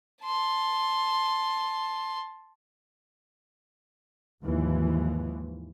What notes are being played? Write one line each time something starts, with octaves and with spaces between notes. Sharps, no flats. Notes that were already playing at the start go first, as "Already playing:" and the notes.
A5 C6
D#2 G#2 E3 F3